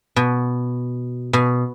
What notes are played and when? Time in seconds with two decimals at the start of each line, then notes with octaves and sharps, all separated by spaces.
0.16 B2
1.33 B2